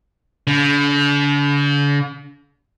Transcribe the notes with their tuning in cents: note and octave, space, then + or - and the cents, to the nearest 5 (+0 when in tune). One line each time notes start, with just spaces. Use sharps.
D3 -45